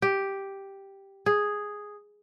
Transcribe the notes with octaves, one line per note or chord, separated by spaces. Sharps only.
G4
G#4